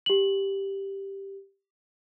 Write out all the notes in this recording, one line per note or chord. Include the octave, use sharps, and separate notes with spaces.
G4 F#7